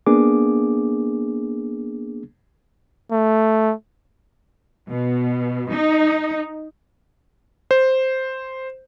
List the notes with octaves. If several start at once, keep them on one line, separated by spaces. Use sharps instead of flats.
A#3 B3 D4 G#4 D6
A3
B2
D#4
C5